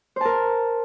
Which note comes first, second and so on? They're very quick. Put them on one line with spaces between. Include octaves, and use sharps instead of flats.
C5 A5 A#4